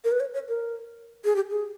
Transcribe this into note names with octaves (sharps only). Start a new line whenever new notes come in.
A#4
B4
C#5
C#5
A#4
G#4
G4
G#4